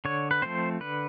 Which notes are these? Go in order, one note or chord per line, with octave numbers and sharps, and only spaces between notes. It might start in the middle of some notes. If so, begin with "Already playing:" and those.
D3 C#5
B4
F3 A3 C4 C5
D3 B4